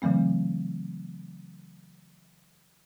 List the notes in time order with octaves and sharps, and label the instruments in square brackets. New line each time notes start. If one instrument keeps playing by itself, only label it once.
[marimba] C#3 E3 F#3 A3 C4